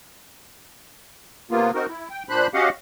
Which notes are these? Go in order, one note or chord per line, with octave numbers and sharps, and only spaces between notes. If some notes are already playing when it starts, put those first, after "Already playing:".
C3 A#3 B3 F4
C4 D#4 F#4 A#4
E4
G5
A#2 D4 C5 B5 F#6
C#4 F#4 G4 D#5 F5 F#5